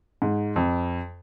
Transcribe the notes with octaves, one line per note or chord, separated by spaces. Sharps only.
G#2
F2